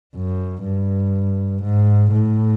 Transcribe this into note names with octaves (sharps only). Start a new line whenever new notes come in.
F#2
G2
G#2
A2